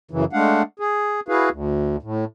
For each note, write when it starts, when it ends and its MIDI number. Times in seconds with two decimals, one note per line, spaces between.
0.11 0.25 42
0.11 0.25 49
0.11 0.25 52
0.33 0.62 56
0.33 0.62 57
0.33 0.62 62
0.33 0.62 77
0.33 0.62 78
0.80 1.20 68
1.29 1.49 64
1.29 1.49 66
1.29 1.49 68
1.29 1.49 71
1.29 1.49 77
1.51 1.96 38
2.03 2.25 45